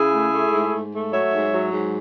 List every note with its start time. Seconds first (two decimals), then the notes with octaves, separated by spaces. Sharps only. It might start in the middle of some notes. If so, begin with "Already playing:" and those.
Already playing: C#3 E4 G#4
0.12 A3
0.32 A3
0.52 G#2
0.72 G#2
0.92 A3
1.12 F#3 C#5 E5
1.33 G#2
1.52 F#3
1.72 G#2